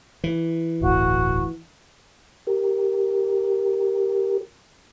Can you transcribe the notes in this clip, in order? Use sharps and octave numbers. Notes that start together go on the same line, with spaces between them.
E3
D1 G1 A2 F#4
G4 A#4